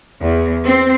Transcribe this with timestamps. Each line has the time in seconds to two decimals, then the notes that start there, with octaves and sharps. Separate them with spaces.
0.21 E2
0.66 C4